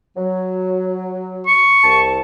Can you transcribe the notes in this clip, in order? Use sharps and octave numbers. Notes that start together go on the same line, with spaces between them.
F#3
C#6
C2 A5